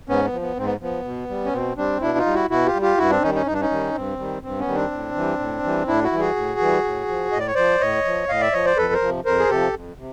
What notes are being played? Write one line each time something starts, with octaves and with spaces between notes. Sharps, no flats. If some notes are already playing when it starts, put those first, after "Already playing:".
G#2 B3 C#4
B3
F3
B3
G#2 C4
B3
F3 B3
B2
G3
C#4
B2 C4
G3 C4 D4
B2 D4 E4
D#4 F4
G3
E4 F#4
B2 E4 F#4
F4 G4
G3
F4 G4
G2 E4 F#4
C4 D4
D#3 G3 C#4 D#4
C#4 D#4
G2 D#4
D4
C#4 D#4
D#3 G3
G2 C4
D#3 G3
G2 C4
B3 C#4
D#3 G3
C4 D4
A2
E3 G3
A2
E3 G3
A2 D4 E4
E4 F#4
E3 G3
F#4 G#4
A2
E3 G3
A2
F3
A2 D#5
D5
C#5
F3 C5 D5
A2 C#5 D#5
F3
A2 D#5 F5
D5 E5
F3 C#5 D#5
C5 D5
F2 A4 B4
A#4 C5
C3 F3
F2 A#4 C5
G#4
C3 F3 G4 A4
F2
C3